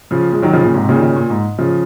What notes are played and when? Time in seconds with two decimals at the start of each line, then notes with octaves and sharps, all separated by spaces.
0.11 C#3 F3
0.32 F3 G#3
0.42 D#3 F#3
0.53 C#3 F3
0.63 A#2 C#3
0.74 G#2 C3
0.89 A#2 C#3
0.96 D#3
1.02 A#2 C#3
1.16 A#2
1.30 G#2
1.58 C#3 F3